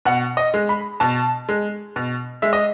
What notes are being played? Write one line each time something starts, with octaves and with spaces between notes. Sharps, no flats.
B2 F#5
D#5
G#3
B5
B2 A5
G#3
B2
G#3 E5
D#5